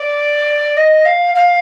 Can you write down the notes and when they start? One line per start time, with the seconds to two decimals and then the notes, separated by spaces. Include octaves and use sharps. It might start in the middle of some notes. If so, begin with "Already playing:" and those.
Already playing: D5
0.77 D#5
1.05 F5
1.35 F5